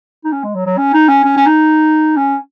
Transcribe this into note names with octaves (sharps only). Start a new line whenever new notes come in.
D#4
C#4
G#3
F#3
F#3
C#4
D#4
C#4
C#4
C#4
D#4
C#4